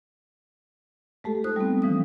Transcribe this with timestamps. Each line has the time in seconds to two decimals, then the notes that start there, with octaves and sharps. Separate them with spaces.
1.24 G#3 A3 G4 A4
1.44 D#4 F4 C5 D#6 F#6
1.56 G3 G#3 B3 C4
1.82 E3 F3 G#3 C#4 D#6